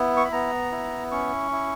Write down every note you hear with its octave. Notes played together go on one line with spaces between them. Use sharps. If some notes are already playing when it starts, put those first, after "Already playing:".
Already playing: B3 E4
C#6
B5
B3 A#5
E4
C#4 C#6
E4